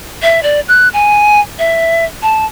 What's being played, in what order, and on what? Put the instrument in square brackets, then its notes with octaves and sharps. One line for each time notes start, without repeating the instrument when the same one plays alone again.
[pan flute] E5
D5
F#6
G#5
E5
A5